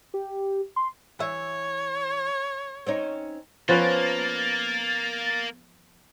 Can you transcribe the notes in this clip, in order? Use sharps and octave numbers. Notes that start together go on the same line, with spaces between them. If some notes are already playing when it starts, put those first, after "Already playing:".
G4
C6
E3 C#5 E5
C4 C#4 D#4
F3 A#3 B3 C#4 A6